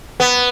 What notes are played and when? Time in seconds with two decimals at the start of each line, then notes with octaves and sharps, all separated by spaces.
0.20 B3